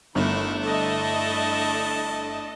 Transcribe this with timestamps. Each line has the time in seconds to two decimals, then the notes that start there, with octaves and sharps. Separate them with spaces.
0.15 G1 D#3 A3 E4 B5
0.60 D4 A4 D#5 A5